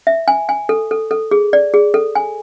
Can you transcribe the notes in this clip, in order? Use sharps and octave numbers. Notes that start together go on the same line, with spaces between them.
E5
G#5
G#5
A4
A4
A4
G#4
D5
G#4
A4
G#5